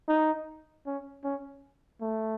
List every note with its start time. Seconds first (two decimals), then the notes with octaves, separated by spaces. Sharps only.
0.09 D#4
0.87 C#4
1.24 C#4
2.01 A3